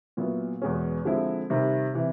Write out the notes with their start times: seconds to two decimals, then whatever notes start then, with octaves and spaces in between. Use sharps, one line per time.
0.17 A#2 F#3 B3 E4
0.62 E2 B2 G#3 C#4
1.05 D3 F3 G#3 C4 E4
1.50 C3 D#3 G3 C4
1.94 C3 E3